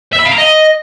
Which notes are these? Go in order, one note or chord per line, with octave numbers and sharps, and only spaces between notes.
E5
B5
F5
A#5
D#5